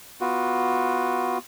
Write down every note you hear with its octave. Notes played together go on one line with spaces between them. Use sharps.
B3 F4 F#4